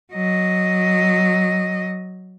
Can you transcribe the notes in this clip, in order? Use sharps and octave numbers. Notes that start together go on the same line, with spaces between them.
F#3 D#5